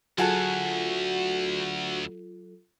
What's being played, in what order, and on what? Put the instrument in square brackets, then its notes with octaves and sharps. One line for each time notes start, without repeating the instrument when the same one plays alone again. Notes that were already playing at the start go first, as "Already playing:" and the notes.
[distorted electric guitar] D2 [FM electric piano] F#3 F4 A4 [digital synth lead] F#4 [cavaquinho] G#4 F#5 A5